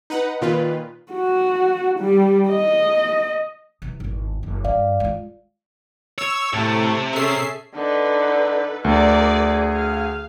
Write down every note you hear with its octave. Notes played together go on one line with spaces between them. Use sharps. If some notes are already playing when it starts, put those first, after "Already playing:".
D#4 B4 F#5
A#2 D#3 F4 B4
F#4
G3
D#5
C3 E3
G#1 E2
F#1
G2 D5 F5
G#3 F4
C#5 E6
A2 C3 A3 A5
C#4 G#4 A4 E5 C7
D3 D#4 A4 B4
D2 G#4 A#4 D5
F5